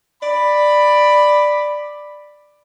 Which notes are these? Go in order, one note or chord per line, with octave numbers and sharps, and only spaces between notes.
D5 B5